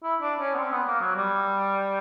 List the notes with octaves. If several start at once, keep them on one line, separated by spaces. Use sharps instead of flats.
E4
D4
C#4
B3
C4
B3
A#3
F#3
G3